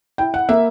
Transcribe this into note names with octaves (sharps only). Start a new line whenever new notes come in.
E4 G5
F#5
A#3 E5